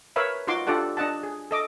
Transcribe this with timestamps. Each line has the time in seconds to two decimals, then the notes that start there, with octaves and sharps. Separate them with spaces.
0.16 A#4 B4 C#5 E5 F5 B5
0.47 D#4 F4 F#4 C6 D6
0.67 D4 F4 G4 A4 D5 F#5
0.97 D4 D#5 F#5 A5
1.23 G#4
1.51 A4 D#5 D6